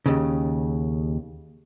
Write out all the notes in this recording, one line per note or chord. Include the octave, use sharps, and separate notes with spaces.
D#2 C#3